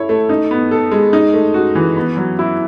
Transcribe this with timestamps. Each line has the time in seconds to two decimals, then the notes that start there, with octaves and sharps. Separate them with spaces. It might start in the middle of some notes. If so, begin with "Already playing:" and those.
Already playing: E4 A4 C#5
0.09 A3
0.29 D#4
0.51 B3
0.71 A4
0.92 G#3
1.13 D#4
1.34 A3
1.54 F#4
1.75 E3
1.97 B3
2.17 F#3
2.39 E4